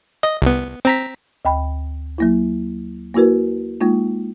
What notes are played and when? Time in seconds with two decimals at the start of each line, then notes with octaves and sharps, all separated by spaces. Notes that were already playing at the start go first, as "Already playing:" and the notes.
0.23 D#5
0.42 C2 B3
0.85 C4 A#5 B6
1.45 D2 G5 B5
2.18 F#3 A#3 E4
3.14 A#3 E4 F#4 A#4 B4
3.81 G#3 A#3 D#4 F4